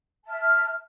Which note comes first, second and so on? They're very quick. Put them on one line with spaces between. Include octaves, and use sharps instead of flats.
A5 E5 F6